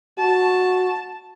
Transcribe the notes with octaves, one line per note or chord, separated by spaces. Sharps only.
F#4 A5